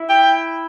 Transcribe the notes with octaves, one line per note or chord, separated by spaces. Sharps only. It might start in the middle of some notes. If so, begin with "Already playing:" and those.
Already playing: E4
G5